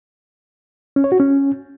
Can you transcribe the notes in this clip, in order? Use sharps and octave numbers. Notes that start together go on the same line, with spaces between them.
C#4
C#5
F#4
C#4